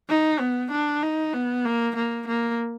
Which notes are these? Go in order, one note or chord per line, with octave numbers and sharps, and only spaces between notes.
D#4
B3
D4
D#4
B3
A#3
A#3
A#3